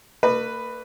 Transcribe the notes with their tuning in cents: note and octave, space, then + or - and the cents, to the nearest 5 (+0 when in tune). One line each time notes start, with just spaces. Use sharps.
A#3 -40 B4 +0 D#5 -45